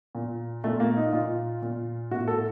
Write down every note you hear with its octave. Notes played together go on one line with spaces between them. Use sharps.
A#2
A#2 A3
A#3
D#4
A#2 F4
A#2
A2 F#4
A4